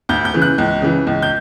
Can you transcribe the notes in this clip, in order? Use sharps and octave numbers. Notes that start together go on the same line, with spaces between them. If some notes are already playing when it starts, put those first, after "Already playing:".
D2 G6
G6
C#3 E3
F#6
C#2
C#3 E3
C#2
G6